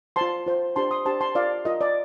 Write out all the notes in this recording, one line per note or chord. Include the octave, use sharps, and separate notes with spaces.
F4 C5 A5 C6
F4 C5
D4 G4 C5 A5 C6
C6 D#6
D4 G4 C5 A5 C6
A5 C6
F4 A#4 D5 F5
F4 A#4 D#5
D5